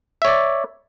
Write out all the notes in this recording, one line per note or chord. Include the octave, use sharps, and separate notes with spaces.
C#5 D5 E5